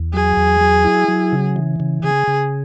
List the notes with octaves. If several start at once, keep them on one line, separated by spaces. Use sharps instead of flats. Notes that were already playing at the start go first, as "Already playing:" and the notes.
Already playing: E2
F#3 G#4
E2
F#3
E4
F#3
C#3
E3
C#3
C#3 G#4
C#3